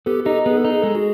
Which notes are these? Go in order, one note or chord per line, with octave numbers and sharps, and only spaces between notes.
B3 G4 A4
D#4 G4 A4
B3 G#4
A4
D#4
G#4
G#3 A4
F#4 G#4